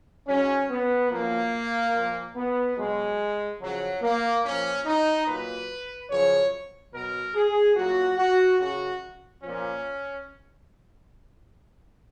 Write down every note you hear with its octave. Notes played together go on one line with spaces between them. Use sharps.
G#2 F#3 C#4
B3
F#2 F3 A#3
A#2 F3
B3
B2 F#3 G#3
F#2 C#3 F3 F#3
A#3
A#2 F3 C#4
D#4
A#2 F#3 B4
F#2 C#3 F3 C#5
B2 F#3 A#4
G#4
A#2 F#3 F#4
F#4
F#2 C#3 F#3 F#4
A#2 F3 C#4